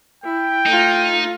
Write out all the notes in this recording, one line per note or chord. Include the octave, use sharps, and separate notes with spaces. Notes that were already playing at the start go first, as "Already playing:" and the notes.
E4 G5
A3 D#4 F4